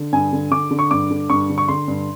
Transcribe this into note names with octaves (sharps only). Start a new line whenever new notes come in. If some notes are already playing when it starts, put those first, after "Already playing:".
Already playing: D3
G2 G#5
D3
D3 D6
D3
C#6
G2 D6
D3
G2 C#6
D3
C#6
D3 C6
G2